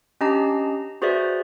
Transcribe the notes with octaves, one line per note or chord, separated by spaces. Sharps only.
C#4 D4 G4 D#5 A5 A#5
F#4 G#4 B4 C5 D5 E5